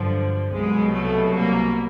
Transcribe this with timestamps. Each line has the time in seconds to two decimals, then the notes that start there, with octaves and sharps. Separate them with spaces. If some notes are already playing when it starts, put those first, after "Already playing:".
Already playing: G2 D3 F3 F#3
0.51 C2 B2 F#3 G#3
0.93 A3
1.35 A#3